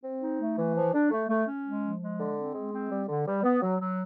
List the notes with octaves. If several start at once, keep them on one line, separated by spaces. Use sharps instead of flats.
C4
D#4
A3
E3
F3
D4
A3
A3
C#4
G#3
F3
G#3
D3
C4
G#3
C4
G3
D3
G3
B3
F#3
F#3